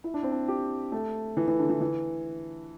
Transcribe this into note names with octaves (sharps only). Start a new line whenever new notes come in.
E4
D4
C4
D4
G4
A3
E3
E3
D3
E3
E3